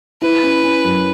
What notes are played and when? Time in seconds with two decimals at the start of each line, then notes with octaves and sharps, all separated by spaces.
0.22 E4 B4
0.43 C#4
0.63 C#4
0.84 F#2